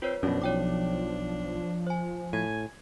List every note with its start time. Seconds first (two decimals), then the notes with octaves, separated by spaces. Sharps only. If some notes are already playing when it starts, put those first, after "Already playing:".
0.02 C4 F4 B4 C#5
0.23 F#2 B2 F3 C#4 D4
0.42 B1 C#5 G5 D6
1.87 C5 G#5
2.33 A2 G#5 G#6